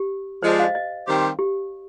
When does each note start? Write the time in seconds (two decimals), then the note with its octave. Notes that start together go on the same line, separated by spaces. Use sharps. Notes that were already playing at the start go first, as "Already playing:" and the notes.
Already playing: G4
0.42 F3 G#3 D4 C5
0.59 F5
0.64 D#5
0.75 D#5
1.07 D#3 G3 C4 G4 C5
1.39 G4